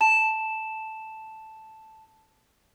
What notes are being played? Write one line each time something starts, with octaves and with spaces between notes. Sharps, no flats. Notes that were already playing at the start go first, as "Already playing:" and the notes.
A5 E7